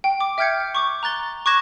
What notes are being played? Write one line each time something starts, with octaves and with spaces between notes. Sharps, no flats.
G5
D6
E5 G5 F6 G6 G#6 C#7
C#6 D6 G6
A#5 F#6 A6 G7
C#6 D6 F#6 G#6 A#6 E7